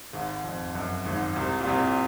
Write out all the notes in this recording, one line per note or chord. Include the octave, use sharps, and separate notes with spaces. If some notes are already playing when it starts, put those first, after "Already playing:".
G#1 G#2
F2
F#2
G#1 G#2
C2 C3
A#2
C2 C3